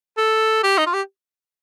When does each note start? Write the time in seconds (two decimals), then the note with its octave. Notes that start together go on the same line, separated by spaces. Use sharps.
0.18 A4
0.63 G4
0.78 D#4
0.86 F4
0.94 G4